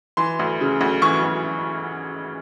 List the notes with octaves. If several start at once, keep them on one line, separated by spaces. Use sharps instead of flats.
E3 C6
D2
C#3
D2
E3 C#6
D2